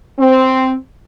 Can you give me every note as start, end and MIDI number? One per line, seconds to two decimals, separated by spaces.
0.18 0.74 60